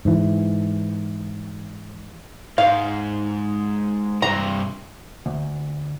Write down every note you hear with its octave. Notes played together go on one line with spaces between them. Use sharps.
G#2 E3
G#2 F5
G2 C3 A#5
D2